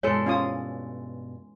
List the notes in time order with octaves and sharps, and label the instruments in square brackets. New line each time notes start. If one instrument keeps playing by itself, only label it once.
[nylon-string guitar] G2 B2 [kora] E3 G#3 A4 [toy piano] C#5
[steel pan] C#4 F4 D#6